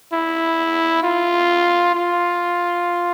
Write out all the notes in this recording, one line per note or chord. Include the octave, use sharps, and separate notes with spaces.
E4
F4
F4